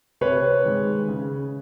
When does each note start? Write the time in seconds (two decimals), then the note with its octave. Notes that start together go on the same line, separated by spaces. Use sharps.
0.21 C3 B4 C#5
0.65 D#3 G#3
1.08 C#3